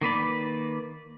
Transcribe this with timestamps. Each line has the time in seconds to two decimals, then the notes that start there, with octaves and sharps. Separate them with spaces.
0.01 D#3 A#3 B4 D5